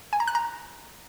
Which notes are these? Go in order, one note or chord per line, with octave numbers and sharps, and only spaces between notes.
G#5
A#5
F#6
A#5